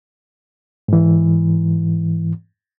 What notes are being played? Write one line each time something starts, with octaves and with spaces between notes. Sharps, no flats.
G#2 E3